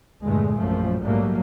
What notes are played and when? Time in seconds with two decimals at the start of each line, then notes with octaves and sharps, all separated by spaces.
0.24 E2 G2 A#2 D3 G#3 A3
0.54 A#1 F#2 F3 A3
1.03 G#2 F#3 G3 A3 A#3